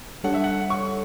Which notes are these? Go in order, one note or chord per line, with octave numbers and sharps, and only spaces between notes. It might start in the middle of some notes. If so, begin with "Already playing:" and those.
G3 D4 A4 C#5 F#5
E5
F#5
C#6